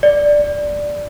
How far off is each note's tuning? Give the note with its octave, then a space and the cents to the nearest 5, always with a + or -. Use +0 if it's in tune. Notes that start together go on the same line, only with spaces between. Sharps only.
D5 +0